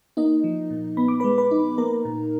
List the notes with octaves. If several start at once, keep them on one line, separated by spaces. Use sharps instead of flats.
A#3 D#4 D#5
F3
A#2
B3 B5
D6
B4 B5
G#3
B4 B5
D#4
A#3 A#4 A#5
A#2